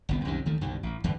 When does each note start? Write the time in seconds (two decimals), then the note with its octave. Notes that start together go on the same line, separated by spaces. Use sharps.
0.09 G1 C2 B3
0.25 C2 F#2 C3 D#3
0.46 D#2 D#3 A3
0.61 C2 G2 B2 D#3
0.83 A1
1.04 E2 G2 D3